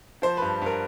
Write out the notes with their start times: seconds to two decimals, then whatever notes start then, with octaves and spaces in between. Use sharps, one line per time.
0.22 F3 C5
0.37 G2 B4
0.62 G2 A#4